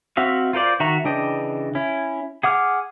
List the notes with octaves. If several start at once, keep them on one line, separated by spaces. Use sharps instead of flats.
C4 F#4 E5 F5
F4 A#4 C5 D5
D#3 F#4 E5 A#5 C#6
C#3 E3 D4 D#5 G5
C#4 E4
G#4 F#5 D6 F6